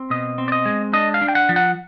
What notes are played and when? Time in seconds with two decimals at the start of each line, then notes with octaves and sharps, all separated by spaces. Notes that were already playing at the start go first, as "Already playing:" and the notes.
Already playing: C4
0.10 B2 D#5
0.38 C4
0.48 D5
0.52 D#5
0.66 G#3
0.93 D4 D#5
1.14 F5
1.21 D4
1.28 G5
1.35 F#5
1.49 F3
1.56 F#5